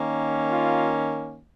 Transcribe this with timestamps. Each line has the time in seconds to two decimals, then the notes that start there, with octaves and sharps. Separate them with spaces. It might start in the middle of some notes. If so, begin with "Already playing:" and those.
Already playing: D#3 A#3 C#4
0.50 F4